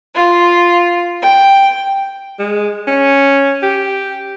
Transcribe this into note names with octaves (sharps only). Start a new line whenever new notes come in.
F4
G5
G#3
C#4
G4